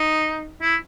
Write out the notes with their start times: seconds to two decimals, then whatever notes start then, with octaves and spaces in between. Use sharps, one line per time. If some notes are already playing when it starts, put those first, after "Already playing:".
Already playing: D#4
0.62 E4